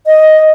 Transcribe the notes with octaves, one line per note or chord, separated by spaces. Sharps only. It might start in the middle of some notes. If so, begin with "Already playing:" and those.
D#5